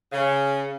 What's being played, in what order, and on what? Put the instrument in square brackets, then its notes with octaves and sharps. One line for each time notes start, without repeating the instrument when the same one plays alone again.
[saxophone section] C#3